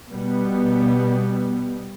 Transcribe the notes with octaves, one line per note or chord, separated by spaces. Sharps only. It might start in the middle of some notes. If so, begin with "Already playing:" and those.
B2 G3 B3